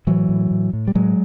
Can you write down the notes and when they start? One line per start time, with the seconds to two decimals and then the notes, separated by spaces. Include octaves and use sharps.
0.07 A2 E3 F#3
0.29 A2
0.51 A2
0.73 A2
0.87 G3
0.95 A2 F#3 G#3